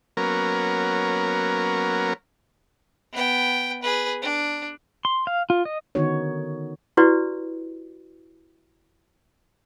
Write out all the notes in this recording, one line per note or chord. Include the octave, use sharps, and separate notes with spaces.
F#3 A#3 B3 C#4 A#4
B3 G5
G#4 B4
D4
C6
F5
F4
D#5
D3 D#3 B3 D#4 F#4 C#5
E4 F#4 G4 B4 D5